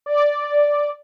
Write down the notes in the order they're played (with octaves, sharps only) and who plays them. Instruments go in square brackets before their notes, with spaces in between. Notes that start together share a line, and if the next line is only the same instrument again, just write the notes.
[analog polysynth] D5